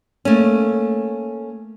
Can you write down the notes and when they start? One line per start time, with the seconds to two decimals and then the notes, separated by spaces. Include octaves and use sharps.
0.25 A3 A#3 C#4